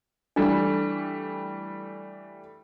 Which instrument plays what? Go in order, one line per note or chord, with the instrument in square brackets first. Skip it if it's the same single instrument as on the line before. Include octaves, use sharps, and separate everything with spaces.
[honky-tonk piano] E3 G3 A3 [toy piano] D4